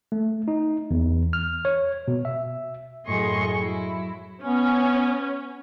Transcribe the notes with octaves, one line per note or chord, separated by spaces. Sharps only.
A3
D#4
E2
F6
C#5
B2
E5
F#2 A2 G#4 D#5 C6 C#6
F#3 E4
B3 C#4